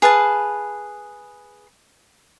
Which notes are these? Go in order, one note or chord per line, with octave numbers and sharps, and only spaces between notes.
G#4 B4 F5 A5